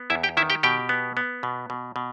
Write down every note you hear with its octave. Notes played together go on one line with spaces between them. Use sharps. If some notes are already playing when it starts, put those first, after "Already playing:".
Already playing: B3
E2 E4 E5
G4 G5
D#3 E4 E5
G4 G5
B2 G4 G5
B3
B3
B2
B2
B2